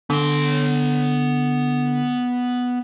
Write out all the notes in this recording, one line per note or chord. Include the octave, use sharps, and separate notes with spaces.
D3 B3 C6